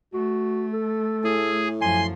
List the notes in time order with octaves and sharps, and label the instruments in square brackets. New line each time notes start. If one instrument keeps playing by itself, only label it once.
[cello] A3 [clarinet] F#4
[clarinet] A4
[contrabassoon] A2 [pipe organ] G#4
[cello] F#2 F3 [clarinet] G#5 [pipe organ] C6